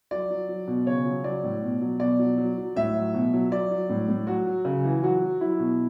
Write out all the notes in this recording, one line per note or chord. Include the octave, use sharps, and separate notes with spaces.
F#3 D5
F#3
F#3
B2
C#3 C#5
F#3
F#3 D5
A2
B2
F#3
B2 D5
F#3
F#3
F#3
A2 E5
F#3
B2
F#3
F#3 D5
F#3
A2
A2
F#3 F#4
F#3
C#3
E3
F#3 F#4
F#3
F#3 E4
B2